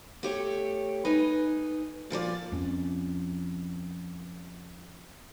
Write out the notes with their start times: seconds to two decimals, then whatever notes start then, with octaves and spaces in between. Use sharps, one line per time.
0.23 A3 G4 C#5
1.05 D#4 B4 G#5
2.10 A#2 F3 A#4 D5
2.52 F2 C#4